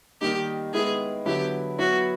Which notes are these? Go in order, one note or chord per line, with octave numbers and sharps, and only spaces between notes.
D#3 G3 A#3 D#4 G4
D#3 G#3 B3 E4 G#4
D3 F#3 B3 E4 G4
F#3 B3 E4 F#4